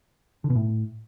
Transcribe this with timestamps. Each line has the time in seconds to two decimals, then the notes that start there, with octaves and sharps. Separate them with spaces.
0.44 D3
0.50 B2
0.55 A2